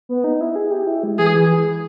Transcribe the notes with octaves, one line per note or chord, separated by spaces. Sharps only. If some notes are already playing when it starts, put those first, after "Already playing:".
B3
D#4
E4
G#4
G4
E4
G#3
E3 G#4
E3